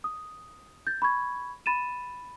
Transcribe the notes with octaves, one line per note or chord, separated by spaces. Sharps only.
D#6
G6 A6
B5 C#6 G#6
B5 A6 D#7 E7